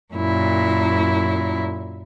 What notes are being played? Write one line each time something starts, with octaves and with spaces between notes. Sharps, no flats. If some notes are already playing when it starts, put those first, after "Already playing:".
F#2 A#2 E4